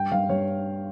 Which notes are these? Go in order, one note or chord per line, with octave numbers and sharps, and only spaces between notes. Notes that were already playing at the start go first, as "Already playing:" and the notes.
Already playing: G2 G5
G2 F5
G2 C#5